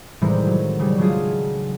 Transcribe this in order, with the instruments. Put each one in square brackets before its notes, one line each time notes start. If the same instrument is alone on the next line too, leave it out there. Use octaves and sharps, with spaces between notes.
[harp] A2 C3 D#3 E3 G3 G#3
F#3
C#3 G3
C#3 F#3 G#3 D4 F4 G#4